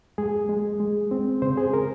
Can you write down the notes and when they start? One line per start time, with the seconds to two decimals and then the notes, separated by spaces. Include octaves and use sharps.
0.18 G#3 G#4
0.49 G#3
0.80 G#3
1.11 C4
1.42 C#3 C5
1.57 G#4
1.74 A#4